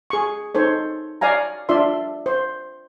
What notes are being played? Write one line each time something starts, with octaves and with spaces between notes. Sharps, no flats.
G#4 C#6
D#4 A4 C5 C#5
C#5 D5 F5 G#5 A#5
D4 F4 D5 E5 C6
C5